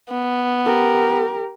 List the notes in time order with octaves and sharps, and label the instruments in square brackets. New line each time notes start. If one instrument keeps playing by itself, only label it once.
[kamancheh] B3
[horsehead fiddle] G4 A#4